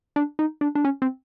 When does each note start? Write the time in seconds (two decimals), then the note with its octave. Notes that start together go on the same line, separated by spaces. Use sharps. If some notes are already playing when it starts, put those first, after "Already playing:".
0.16 D4
0.39 D#4
0.61 D4
0.75 D4
0.85 C#4
1.02 C4